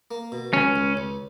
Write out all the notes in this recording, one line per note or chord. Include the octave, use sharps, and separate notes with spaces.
A#3
B2
C#2 C#4
C#2
C#2